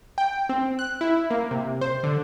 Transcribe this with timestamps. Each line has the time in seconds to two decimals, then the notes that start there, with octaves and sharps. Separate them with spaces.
0.18 G5
0.49 C4
0.79 F#6
1.01 E4
1.31 A#3
1.51 C3
1.81 C5
2.04 D3